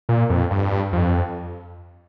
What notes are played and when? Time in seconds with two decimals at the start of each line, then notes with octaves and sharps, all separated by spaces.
0.09 A#2
0.30 F2
0.51 G2
0.93 F2